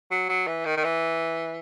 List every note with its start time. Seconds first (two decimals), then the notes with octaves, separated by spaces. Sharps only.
0.11 F#3
0.29 F#3
0.47 E3
0.65 D#3
0.77 D#3
0.84 E3